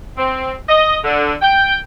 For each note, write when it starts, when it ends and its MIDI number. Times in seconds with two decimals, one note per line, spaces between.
0.17 0.53 60
0.68 0.97 75
1.03 1.33 50
1.42 1.76 79